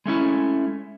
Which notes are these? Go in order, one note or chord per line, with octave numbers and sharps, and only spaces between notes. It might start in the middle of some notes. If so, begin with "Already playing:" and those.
G#3 A3 C#4 E4